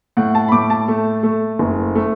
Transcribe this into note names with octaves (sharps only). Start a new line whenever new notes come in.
A2 F#5
A5
B5
A2 D6
A5
A3
A3
F#1
A3